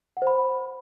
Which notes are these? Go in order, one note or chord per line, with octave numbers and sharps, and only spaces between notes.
F#5
C5
B5